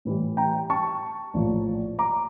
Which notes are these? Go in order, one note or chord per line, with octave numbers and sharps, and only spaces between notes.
A2 E3 G3
G5 A#5
A5 C#6
A#1 A2 F3 A#3
A#5 D6